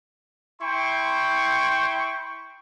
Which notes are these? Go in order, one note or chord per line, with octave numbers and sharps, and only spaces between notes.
E4 G5 C6 C#6